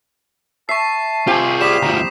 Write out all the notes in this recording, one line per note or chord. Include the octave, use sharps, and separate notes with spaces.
E5 A5 C#6 C7
C4 F4 G4 G#4
G3 F5 D#6 B6 E7
D2 F3 A#5